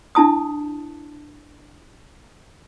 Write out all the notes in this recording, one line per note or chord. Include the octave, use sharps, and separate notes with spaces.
D4 E4 A5 D#6